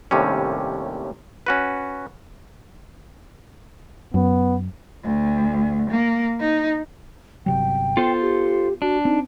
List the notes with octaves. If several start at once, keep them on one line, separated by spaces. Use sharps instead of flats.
D#2 A2 C3 G3 C#4
C#4 F#4 B4
F#2 B3
D2
A#3
D#4
G1 C3 F#3 G5
B3 F4 A4 C5
G4
D4 F#4
C4 D#4